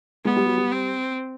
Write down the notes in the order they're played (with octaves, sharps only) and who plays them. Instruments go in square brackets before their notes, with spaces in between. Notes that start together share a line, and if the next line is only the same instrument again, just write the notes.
[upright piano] G#3 [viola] B3
[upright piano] G3
F#3
G3
[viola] C4